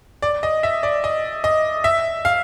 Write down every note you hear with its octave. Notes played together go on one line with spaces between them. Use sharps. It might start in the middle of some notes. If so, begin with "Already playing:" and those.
D5
D#5
E5
D5
D#5
D#5
E5
F5